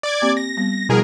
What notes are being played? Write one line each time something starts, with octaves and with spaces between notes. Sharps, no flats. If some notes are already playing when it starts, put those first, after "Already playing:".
D5 D6 G#6
A#3 C4 G4
A#6
G3 B3
B2 F3 G3 E4 G#4 A#4